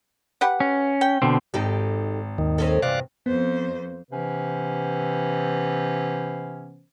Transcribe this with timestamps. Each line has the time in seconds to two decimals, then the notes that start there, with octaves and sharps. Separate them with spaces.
0.41 G4 B4 F#5
0.60 C#4
1.01 G5
1.22 B2 D3 C4
1.54 G#1 D#4 G4 A4
2.38 D#2 D#3
2.58 C4 C#4 A4
2.82 E2 G2 C3 D5 F5 F#6
3.26 F2 B3 C5
4.11 C3 E3 B3 C#4 B4 C5